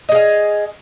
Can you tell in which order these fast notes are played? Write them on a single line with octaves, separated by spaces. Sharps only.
D#5 G#4 F5